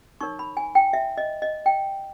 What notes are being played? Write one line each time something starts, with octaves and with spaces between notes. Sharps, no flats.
D#4 A#4 C#5 C#6
B5
G#5
G5
E5
D#5
D#5
G5